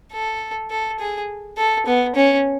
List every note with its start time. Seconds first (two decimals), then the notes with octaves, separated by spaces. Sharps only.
0.12 A4
0.71 A4
0.99 G#4
1.57 A4
1.86 B3
2.15 C#4